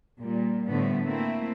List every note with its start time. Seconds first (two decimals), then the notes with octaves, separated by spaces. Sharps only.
0.21 A#2 G3
0.69 A2 D3 F3 G3 A3 B3
1.03 A3 A#3 C4 E4